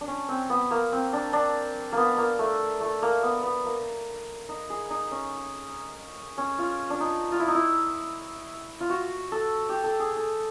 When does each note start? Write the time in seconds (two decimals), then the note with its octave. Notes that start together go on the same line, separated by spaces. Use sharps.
0.01 D4
0.07 C#4
0.29 C4
0.50 B3
0.71 A#3
0.92 C4
1.13 D4
1.33 D4
1.92 A#3 B3
2.17 A#3
2.39 A3
2.81 A3
3.02 A#3
3.23 B3
3.43 B3
3.65 A#3
4.49 D#4
4.70 G#4
4.90 D#4
5.11 C#4
6.38 C#4
6.58 F4
6.90 D4
7.00 D#4
7.32 F4
7.40 E4
7.48 D#4
7.55 E4
8.80 F4
8.90 F#4
9.32 A4
9.69 G4
9.84 A4
9.99 G#4
10.16 A4